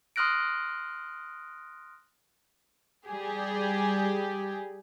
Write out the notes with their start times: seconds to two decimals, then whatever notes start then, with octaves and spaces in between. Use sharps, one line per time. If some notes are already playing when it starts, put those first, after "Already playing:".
0.16 C6 D#6 F6 F#6 A#6 D7
3.07 G3 G4 G#4